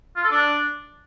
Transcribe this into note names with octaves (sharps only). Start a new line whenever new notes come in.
F4
A4
D4